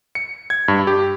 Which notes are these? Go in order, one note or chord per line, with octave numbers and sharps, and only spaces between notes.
C#7
G#6
G2
G4